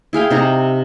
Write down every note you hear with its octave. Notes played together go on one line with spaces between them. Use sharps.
E4 G#4 F5 G5
C3 D#4 G4 A#5